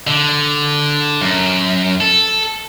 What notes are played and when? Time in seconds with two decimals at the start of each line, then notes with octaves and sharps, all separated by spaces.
0.07 D3
1.21 F#2
2.01 A4